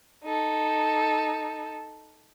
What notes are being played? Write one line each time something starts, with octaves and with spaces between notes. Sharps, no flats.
D#4 A4